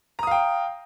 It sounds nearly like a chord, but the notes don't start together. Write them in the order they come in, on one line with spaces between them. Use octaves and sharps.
A#5 D#6 F5 G5